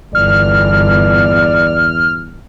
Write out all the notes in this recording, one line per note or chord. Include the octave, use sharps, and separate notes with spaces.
G1 E2 D5 F6